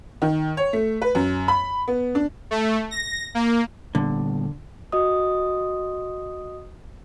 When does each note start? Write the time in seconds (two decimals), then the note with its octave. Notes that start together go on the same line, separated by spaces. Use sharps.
0.22 D#3
0.57 C#5
0.73 A3
1.02 B4
1.15 F#2
1.48 B5
1.88 B3
2.15 D4
2.51 A3
2.91 A#6
3.35 A#3
3.95 A#2 D3 G3 B3
4.92 F#4 D#5 D#6